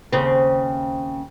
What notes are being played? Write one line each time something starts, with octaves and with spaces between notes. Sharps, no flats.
D#2 C#3 C4